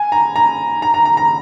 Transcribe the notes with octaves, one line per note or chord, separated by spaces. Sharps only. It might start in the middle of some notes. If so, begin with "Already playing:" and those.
Already playing: G#5
A#5
A#5
A#5
A#5
A#5
A#5